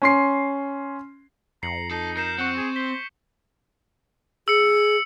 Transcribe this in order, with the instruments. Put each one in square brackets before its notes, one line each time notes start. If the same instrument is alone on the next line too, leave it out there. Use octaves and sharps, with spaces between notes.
[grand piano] C#4 C6 C7
[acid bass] F2 [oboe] A#5 [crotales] C7 C#7 F#7
[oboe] D#4 [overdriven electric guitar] A4
[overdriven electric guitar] A#4 [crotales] G6 C7 E7
[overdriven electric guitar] C4 [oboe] F#5 [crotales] C#6 C#7
[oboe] G#4
[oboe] C5 [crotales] B6 G7
[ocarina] G#4 [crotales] E6 C#7